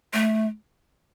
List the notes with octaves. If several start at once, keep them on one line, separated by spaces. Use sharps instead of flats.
A3